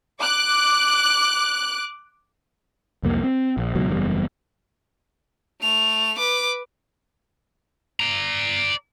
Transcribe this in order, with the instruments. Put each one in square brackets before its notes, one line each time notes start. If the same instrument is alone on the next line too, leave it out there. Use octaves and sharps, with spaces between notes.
[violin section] D6 F#6
[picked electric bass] C2 F2 A#3
C4
A#1
C#2 B2 F#3
F#1 E2 C#3 G3
[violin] A3 F7
B4 D6
[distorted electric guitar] D5 A#5